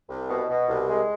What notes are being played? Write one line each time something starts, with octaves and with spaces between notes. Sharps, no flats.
C2
B2
B2
C2
G#3